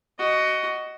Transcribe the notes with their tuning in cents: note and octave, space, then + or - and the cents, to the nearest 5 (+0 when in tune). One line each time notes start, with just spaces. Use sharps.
F#4 +15 D#5 +0